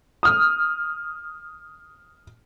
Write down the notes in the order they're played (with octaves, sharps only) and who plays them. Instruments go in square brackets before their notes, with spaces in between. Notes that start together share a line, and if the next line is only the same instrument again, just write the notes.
[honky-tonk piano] D#6 F6